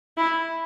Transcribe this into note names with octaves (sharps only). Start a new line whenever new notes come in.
E4